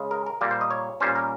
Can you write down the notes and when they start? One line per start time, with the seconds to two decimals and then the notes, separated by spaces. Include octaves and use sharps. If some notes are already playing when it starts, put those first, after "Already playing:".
Already playing: C#3 G#3 C#4
0.11 A#4
0.26 A#4
0.41 A#2 G3 A#3
0.51 C5
0.61 D#5
0.71 C#5
1.00 A#2 G3 C#4 C5
1.16 A#4